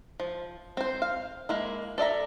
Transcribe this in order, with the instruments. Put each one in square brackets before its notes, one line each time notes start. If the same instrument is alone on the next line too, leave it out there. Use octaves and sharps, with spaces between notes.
[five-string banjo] F3
C4 C5
F5
G#3 A#3 E4
A4 D5 E5 A#5